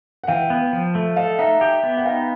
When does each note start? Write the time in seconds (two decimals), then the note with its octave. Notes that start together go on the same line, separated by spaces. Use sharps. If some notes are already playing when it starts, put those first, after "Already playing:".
0.24 F#5
0.28 E3 F5 G5
0.50 B3
0.73 F3
0.95 A3
1.16 A4 D#5 F5
1.38 D#4 E5 F#5
1.61 G4
1.83 B3
1.97 F#5
2.05 D#4 F5 G5